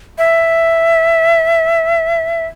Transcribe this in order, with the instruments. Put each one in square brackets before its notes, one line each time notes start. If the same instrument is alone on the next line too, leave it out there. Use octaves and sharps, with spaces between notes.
[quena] E5